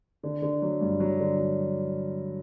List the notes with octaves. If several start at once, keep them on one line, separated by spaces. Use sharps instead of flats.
D3
D3
F#3
G2
F#3
D3
F#3